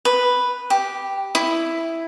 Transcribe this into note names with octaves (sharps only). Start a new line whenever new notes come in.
B4
G4
E4